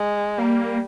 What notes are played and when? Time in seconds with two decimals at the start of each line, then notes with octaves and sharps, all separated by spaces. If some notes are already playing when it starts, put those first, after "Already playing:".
Already playing: G#3
0.38 G3 A#3